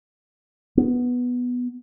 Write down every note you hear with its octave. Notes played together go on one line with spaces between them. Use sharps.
B3